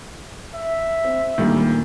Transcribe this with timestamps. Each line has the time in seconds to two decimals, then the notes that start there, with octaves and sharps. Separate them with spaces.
0.54 E5
1.05 C4
1.38 D2 A#2 D#3 G3 A#3